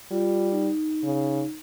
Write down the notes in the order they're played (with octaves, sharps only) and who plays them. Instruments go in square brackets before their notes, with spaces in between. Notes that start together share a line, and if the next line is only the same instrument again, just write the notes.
[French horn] G3 [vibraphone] F4
[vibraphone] D#4
[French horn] C#3